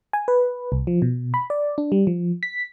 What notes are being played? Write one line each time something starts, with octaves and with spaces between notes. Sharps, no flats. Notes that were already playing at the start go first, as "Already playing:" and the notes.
G#5
B4
C2
F3
B2
B5
D5
D4
G3
F3
B6